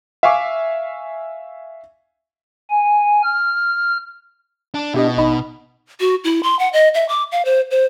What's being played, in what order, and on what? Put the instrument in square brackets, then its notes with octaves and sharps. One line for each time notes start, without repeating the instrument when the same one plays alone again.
[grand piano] E5 F5 G#5 C#6 D6
[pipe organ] G#5
F6
[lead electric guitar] D4
[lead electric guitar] B2 [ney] D4 [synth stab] E4 G4 D#5
[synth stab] A1 D#5 B5 [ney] D#4
[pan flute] F#4
E4
C6
F#5
D#5
E5
D6
F5
C5
C5